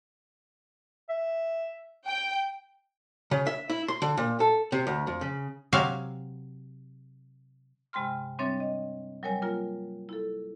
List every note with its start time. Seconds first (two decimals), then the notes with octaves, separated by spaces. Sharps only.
1.09 E5
2.06 G5
3.31 C#3
3.47 E5
3.70 E4
3.88 C6
4.02 D3
4.17 A#2
4.40 A4
4.72 C3
4.87 D2
5.07 F2
5.21 C#3
5.73 C3 F#3 E5 F5 G#5
7.93 G2 C3 G#3 G5 C6 F6
8.39 G3 C4 D4 C#5 E5 A6
8.60 D#5
9.23 F#3 G3 A#4 C#5 G#5
9.42 A#3 F4 A#4
10.09 E4 A4